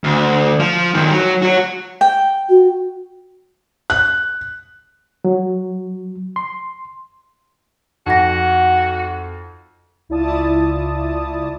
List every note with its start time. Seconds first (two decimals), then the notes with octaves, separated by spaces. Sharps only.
0.04 D2
0.60 F3
0.95 F#2 D#3
1.12 F#3
1.42 F#4 C#5
2.01 G5
2.49 F#4
3.90 F#6
5.25 F#3
6.36 C6
8.06 F2 D#4 F#4 F#5 A#6
10.09 C#2 E4 F4 D5 A5 D#6